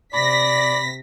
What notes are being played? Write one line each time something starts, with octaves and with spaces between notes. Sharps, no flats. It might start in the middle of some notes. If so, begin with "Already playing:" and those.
C3 D5 B5 A#6 B6